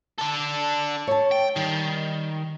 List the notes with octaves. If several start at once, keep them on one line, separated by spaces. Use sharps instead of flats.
D4 A4
C#5 A5
G5
D#3 G3